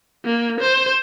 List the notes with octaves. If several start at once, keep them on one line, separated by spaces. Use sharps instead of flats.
A#3
C5